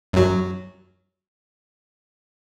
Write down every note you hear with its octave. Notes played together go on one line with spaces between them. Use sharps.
F#2 F#3